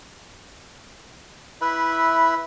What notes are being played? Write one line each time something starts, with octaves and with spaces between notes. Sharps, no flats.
E4 B4 E5 B5